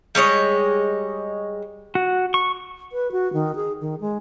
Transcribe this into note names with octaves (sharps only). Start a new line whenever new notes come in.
G3 G#3 C#5 D#5
F#4
C#6
B4
F#4
D#3
G#4
D#3
G#3